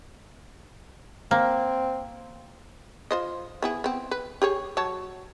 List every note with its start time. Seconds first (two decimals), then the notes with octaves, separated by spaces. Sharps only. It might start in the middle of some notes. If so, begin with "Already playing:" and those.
1.31 A#3 C4
3.11 F4 C5 D#5
3.63 B3 E4 G#4
3.84 B3 C4
4.11 B4
4.42 G4 G#4 C#5
4.77 F#3 C#5 A5